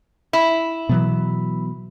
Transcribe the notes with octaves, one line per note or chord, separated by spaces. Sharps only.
E4
B2 E3 F#3 B3